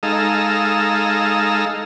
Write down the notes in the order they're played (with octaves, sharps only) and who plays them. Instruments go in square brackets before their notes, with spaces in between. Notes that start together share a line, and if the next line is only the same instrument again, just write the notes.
[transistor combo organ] G#3 D#4 A4 F5 A#5 E6